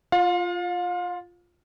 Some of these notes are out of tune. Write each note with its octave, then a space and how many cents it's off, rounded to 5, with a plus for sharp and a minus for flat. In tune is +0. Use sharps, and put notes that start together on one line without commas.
F4 +0 F5 +35